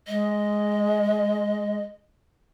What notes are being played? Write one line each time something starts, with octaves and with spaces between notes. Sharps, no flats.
G#3 D#5